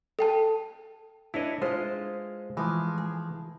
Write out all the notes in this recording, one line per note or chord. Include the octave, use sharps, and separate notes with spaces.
A4 G5 A5
D4 E4 B4 C#5 D#5
G#3 F4 C5 D#5
E3 F3 G#3
G#4